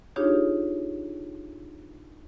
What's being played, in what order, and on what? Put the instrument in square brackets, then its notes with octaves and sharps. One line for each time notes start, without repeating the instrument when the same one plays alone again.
[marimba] D4 D#4 F4 G4 G#4 C#5